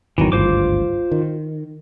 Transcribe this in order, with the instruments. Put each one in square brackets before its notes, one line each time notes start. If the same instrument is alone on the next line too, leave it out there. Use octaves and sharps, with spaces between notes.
[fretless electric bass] G#1 E2 F#3 [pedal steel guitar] D#3 E3
[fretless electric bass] G#1 D2 G2 [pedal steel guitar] F4 C5 D6
[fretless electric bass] D#3